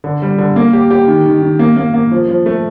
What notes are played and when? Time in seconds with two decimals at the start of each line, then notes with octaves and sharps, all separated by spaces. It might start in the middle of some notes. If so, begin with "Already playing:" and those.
0.04 D3
0.22 G3
0.38 D3
0.56 A#3
0.73 G4
0.91 G4
1.08 D#3
1.26 D#3
1.42 D#3
1.59 A#3
1.77 A#3
1.94 A#3
2.11 F3
2.29 F3
2.46 A3